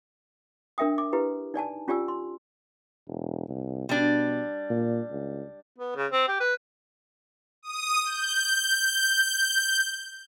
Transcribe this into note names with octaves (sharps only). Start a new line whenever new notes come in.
D4 A#4 E5 G5 D#6
D6
E4 G4 B4
D#4 D5 G#5 A5
C#4 F4 G4 D5 G#5 E6
C6
E1
C2
B2 G3 D4
A#2
C#2
B3
C#3
C4
G4
B4
D#6
G6